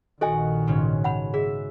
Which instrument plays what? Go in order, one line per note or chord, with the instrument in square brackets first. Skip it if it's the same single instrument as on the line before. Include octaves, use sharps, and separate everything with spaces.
[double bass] A#1 D#3 [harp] F#4 [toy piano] A4 D#5 G#5
[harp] G#2 C#3 C#4
[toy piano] F#5 B5
[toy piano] G#4 [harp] E5